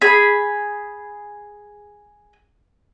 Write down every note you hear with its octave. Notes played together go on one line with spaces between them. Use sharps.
G#4 B5